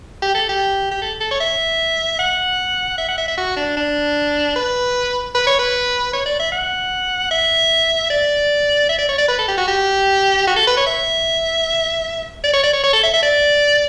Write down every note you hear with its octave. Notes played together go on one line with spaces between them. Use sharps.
G4
A4
G4
G4
A4
A4
C#5
E5
F#5
E5
F#5
E5
E5
F#4
D4
D4
B4
B4
C#5
B4
C#5
D5
E5
F#5
E5
D5
E5
D5
C#5
D5
B4
A4
G4
F#4
G4
F#4
A4
B4
C#5
E5
D5
C#5
D5
C#5
C#5
A4
E5
E5
D5